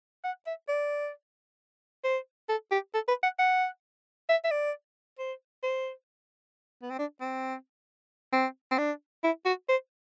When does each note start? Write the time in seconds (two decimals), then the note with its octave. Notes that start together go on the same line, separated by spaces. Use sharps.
0.24 F#5
0.47 E5
0.69 D5
2.04 C5
2.49 A4
2.71 G4
2.94 A4
3.08 B4
3.23 F#5
3.39 F#5
4.29 E5
4.44 E5
4.51 D5
5.19 C5
5.63 C5
6.82 B3
6.90 C4
6.99 D4
7.21 C4
8.33 C4
8.71 C4
8.78 D4
9.24 E4
9.46 F#4
9.69 C5